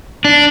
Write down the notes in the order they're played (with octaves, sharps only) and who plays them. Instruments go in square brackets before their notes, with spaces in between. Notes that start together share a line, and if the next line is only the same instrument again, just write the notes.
[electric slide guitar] D4